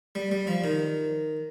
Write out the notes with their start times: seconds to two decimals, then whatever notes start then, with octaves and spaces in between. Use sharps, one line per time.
0.15 G3
0.31 G3
0.47 F3
0.64 D#3